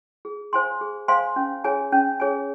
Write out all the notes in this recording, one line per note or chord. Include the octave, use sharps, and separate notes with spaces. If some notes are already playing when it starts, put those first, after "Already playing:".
G#4
C5 F5 G#5 C6
G#4
C5 F5 G#5 C6
C#4
G#4 C#5 G#5
C#4
G#4 C#5 G#5